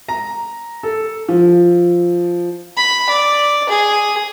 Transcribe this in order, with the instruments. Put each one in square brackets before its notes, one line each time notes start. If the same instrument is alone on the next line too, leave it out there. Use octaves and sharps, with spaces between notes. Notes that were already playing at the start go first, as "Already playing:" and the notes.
[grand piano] A#5
A4
F3
[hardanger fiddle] B5
D5
G#4